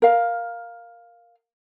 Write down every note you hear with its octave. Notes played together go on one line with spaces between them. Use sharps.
A#4 F5